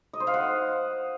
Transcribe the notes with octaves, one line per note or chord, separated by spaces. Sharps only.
D#5
C5
F5
F#5